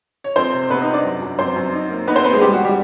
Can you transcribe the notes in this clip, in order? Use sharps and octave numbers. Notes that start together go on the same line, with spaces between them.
C#5
F2 C4 C5
C3
C3 B3 B4
D#4 D#5
C3
D4 D5
F#2
F#2
F#2 C4 C5
F#2
D#4
A#3
B3 D#4 B4
C4 C5
A#3 B3 B4
G#3 G#4
E1 G3 G4
F#4
G3 G4